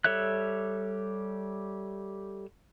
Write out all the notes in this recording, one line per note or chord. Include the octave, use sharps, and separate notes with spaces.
G3 A4 C#5 E5 F#6